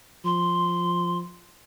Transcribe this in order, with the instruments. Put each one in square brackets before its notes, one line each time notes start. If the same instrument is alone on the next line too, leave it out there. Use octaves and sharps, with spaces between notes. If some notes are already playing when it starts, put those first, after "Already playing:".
[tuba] F3 [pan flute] C6